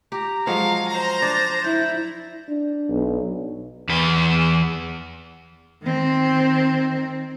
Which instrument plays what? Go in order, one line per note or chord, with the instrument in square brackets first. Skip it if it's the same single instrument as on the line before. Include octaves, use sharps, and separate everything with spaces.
[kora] G4 [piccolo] A#5
[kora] F3 F#3 G#3 [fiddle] F5
[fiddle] C5 A#5
[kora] D4 [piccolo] A6
[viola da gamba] E4 [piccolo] G6
[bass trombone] D4
[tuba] B1
[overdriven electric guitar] E2 B4
[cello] D#3 C4